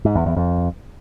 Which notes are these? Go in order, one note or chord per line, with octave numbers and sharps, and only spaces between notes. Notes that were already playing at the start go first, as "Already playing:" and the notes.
G#2
E2
E2
F2